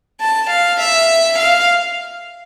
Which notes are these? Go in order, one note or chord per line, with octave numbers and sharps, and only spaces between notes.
A5
F5
E5
F5